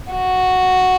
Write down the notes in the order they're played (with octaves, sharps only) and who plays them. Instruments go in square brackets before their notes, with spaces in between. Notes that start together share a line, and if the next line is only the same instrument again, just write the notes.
[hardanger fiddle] F#4